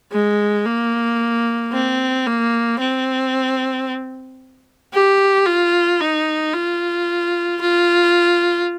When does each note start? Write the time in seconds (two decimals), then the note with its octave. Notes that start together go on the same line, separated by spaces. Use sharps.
0.12 G#3
0.65 A#3
1.72 C4
2.26 A#3
2.79 C4
4.93 G4
5.46 F4
6.01 D#4
6.54 F4
7.61 F4